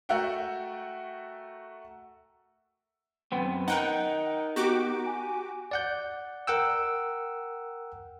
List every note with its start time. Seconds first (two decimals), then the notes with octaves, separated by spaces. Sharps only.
0.09 A3 F#4 A#4 E5 F#5 G5
3.32 F#2 B3 C4
3.68 D#4 A#4 F#5 G5
4.56 B3 F#4 G4 D6
5.06 G#5
5.71 D5 F#5 G6
6.47 A#4 F#5 G5 E6